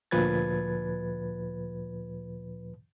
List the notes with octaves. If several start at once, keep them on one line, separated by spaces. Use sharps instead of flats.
D2 A#2 F3 B4 G#6 A6